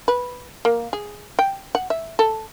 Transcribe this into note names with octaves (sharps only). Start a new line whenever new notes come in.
B4
A#3
G#4
G5
F#5
E5
A4